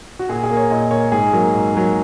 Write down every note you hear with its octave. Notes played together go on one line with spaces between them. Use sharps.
F#4
A#2 G#4
G#4
A#3
C#5
A#2 D#5
A#3 C#5
G#2 G#4
F#3 A#3
G#2
F#3 A#3